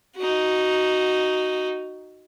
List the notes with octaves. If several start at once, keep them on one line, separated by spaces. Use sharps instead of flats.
D#4 F#4